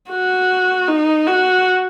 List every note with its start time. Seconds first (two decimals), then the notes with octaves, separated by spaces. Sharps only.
0.10 F#4
0.88 D#4
1.27 F#4